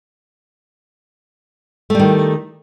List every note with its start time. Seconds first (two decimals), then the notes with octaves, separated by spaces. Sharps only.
1.90 A3
1.95 G3
1.99 D#3